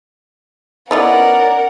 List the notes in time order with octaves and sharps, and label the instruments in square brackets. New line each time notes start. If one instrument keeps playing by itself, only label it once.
[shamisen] B3 D#4 E4 [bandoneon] C#4 D5 [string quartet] A#4 [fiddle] F#5